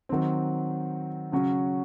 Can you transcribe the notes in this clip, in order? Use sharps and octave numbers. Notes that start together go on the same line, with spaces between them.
D#3 F#3 C4
C#3 F#3 C#4